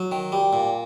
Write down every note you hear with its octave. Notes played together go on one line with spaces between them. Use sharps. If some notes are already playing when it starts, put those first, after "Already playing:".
Already playing: F#3
D#3
G3
A#2